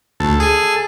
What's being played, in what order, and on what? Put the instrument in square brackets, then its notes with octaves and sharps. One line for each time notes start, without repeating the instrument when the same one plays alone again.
[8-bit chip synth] D2 [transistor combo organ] A4
[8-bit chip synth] G#4 G#5